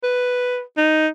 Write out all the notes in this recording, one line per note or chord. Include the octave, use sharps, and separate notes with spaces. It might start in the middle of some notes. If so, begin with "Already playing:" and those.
B4
D#4